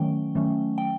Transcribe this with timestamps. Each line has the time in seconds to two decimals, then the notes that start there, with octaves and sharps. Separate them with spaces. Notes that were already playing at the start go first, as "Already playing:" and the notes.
Already playing: D#3 F#3 A3 C#4 G5
0.35 D#3 F#3 A3 C#4
0.78 G5